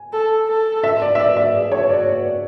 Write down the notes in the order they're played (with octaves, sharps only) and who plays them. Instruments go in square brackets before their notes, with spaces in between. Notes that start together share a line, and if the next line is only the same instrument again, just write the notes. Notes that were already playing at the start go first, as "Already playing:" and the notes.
Already playing: [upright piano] G#5
[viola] A4
A4
[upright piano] E5
D5
E5
D5
E5
[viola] G#4
[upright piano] C#5
C#5
[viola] F#4 [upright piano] D5